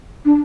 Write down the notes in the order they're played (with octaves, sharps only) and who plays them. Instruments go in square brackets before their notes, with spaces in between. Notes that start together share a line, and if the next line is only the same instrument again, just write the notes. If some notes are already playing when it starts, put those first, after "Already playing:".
[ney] D4